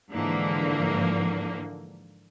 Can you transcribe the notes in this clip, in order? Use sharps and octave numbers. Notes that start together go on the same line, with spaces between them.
G#2 D3 E3 F3 A#3